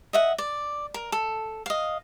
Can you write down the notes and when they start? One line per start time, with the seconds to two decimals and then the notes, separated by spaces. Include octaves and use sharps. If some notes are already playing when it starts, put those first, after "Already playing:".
0.13 D#5 E5 F#5
0.38 D5
0.94 A#4
1.12 A4
1.66 D#5 F5